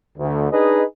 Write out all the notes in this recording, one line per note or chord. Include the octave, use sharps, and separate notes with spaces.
D2
D4 D#4 G#4 B4 D#5